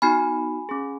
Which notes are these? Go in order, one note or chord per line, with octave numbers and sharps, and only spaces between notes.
B3 D#4 F#4 G#5 B5
C#4 G#4